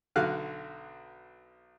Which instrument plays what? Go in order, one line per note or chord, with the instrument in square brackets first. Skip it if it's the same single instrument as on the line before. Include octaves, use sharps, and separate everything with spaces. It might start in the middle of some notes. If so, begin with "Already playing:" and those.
[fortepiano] B1 D3 F#4 F5 F#6